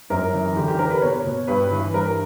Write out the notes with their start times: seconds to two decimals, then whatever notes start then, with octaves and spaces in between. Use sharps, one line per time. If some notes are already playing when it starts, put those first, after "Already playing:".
0.10 F#2 A#4
0.33 E3
0.56 D3 G4
0.68 G4
0.79 D3 A#4
0.90 B4
1.02 B2 C#5
1.24 B2
1.47 G2 B4
1.71 E3
1.93 G2 A#4